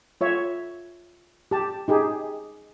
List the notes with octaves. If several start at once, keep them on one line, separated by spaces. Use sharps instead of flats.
F4 C#5 E5
G4 A5
D#4 G4 G#4